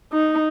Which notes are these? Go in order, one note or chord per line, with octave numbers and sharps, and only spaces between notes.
D#4